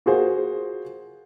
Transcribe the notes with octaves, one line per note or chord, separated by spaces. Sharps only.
F4 F#4 G#4 A#4 C5